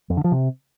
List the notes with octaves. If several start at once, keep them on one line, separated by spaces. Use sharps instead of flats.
F2
D3
F3
C3